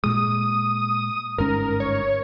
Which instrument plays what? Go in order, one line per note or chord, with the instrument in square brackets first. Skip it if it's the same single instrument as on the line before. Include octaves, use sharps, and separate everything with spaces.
[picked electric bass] A#2 G#3 [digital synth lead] D#6
[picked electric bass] G1 G#2 C#4 [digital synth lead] A#4
[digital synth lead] C#5